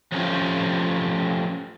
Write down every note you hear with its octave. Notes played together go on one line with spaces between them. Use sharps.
F3 F#3 A3 C#4 F4 G4